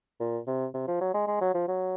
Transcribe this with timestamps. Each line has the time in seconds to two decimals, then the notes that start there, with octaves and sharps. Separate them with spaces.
0.20 A#2
0.47 C3
0.74 C3
0.88 F3
1.01 F#3
1.14 G#3
1.28 G#3
1.41 F#3
1.54 F3
1.68 F#3